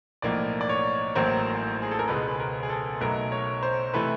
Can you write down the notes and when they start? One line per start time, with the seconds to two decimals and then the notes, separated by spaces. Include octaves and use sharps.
0.22 B1 A2 F3 A#3 D5
0.61 D5
0.69 C#5
1.15 A1 A2 F#3 A#3 C5
1.82 G#4
1.91 A4
1.99 A#4
2.08 C#2 B2 G#3 B4
2.27 B4
2.40 A#4
2.63 G#4
2.69 A4
3.01 B1 B2 F#3 A3 A#4
3.32 C#5
3.63 C5
3.94 C3 E3 A3 B4